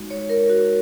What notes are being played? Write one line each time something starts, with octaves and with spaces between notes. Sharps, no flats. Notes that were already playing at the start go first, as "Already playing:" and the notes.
Already playing: G#3 D#4 F#4
C#5
A#4
F#4